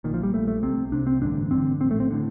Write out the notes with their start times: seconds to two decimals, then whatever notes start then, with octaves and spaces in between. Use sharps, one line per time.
0.04 A#1 A#2 D#3
0.14 F3
0.23 G3
0.34 A#1 A#2 A3
0.48 A3
0.63 C2 C3 C4
0.92 C2 C3 D4
1.07 C4
1.22 A1 G2 D3 D4
1.51 A1 G2 D3 C4
1.80 A#1 C4
1.84 A2
1.91 A3
2.00 C4
2.10 A2 D3